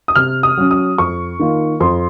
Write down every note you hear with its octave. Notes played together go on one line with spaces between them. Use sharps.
D#6
C3 F6
D#6
F#3 C#4
D#6
F2 C#6
D#3 A#3 F4
F2 C6